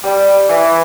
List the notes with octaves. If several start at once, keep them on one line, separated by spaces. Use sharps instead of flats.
G3
E3